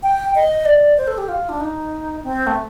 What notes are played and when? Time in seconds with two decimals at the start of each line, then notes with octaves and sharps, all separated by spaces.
0.03 G5
0.35 D#5
0.65 D5
0.97 C5
1.07 A4
1.18 G4
1.28 F4
1.49 D4
1.60 D#4
2.24 C4
2.47 A3